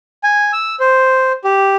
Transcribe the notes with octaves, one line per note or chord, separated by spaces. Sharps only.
G#5
E6
C5
G4